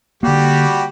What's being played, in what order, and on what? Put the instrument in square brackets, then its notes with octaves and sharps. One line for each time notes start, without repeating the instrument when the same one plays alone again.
[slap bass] D3 A#3 [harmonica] G3 F#4 G4